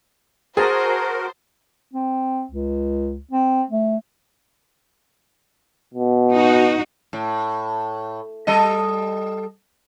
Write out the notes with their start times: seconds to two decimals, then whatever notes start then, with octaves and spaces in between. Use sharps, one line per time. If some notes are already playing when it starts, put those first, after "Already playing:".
0.57 F#4 G#4 A#4 C5 A5 A#5 D#6
1.93 C4
2.51 C#2
3.31 C4
3.71 A3
5.94 B2
6.32 D#4 F#4
7.13 A2
8.47 G3 A4 D#5